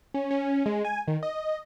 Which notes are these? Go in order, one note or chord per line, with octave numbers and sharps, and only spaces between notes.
C#4
C#4
G#3
G#5
D#3
D#5